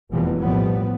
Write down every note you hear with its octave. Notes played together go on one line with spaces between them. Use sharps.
F1 E2 B2 E3 F3 G3
A#1 A2 F3 G3 B3